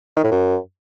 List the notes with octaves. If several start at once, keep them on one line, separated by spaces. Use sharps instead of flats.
D#3
A2
F#2